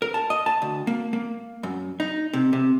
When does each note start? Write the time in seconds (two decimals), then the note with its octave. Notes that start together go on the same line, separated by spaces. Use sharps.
0.02 A#4
0.14 A5
0.30 D#5
0.46 A5
0.62 D2
0.87 A#3
1.13 A#3
1.63 F#2
2.00 D#4
2.33 C3
2.53 C3